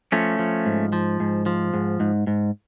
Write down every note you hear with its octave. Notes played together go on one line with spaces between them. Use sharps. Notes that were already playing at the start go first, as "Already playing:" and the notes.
F3 A3 C#4
F3
G#2
F3
G#2
F3
G#2
G#2
G#2